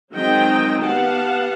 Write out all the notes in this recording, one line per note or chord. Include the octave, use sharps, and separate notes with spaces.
D#3 F#3 G#3 C4 D#5 G5
B3 G4 F5 F#5 A5